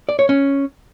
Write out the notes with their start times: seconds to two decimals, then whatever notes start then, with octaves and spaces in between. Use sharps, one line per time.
0.09 D5
0.19 C#5
0.29 C#4